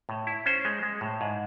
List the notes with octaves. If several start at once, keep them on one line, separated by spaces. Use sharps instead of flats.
A2
E4
C#4 C5
G#3
G#3
A2
G#2